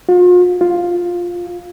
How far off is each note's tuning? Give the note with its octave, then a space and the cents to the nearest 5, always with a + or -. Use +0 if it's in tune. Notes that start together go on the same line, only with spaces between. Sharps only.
F4 +40
F4 +5